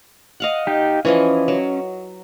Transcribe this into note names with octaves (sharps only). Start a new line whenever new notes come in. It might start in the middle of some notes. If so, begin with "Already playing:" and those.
D#5 F5 F#5
D#4 G4
E3 F3 C#4 D#5
F#3